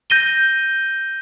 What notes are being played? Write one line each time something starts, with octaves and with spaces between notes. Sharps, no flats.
G6 A#6 D#7 G7